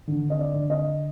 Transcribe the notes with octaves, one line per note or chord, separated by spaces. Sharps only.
D3
D#5
D5
D3
D#5